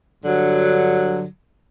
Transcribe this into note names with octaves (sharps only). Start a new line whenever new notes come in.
G2 D3 F#3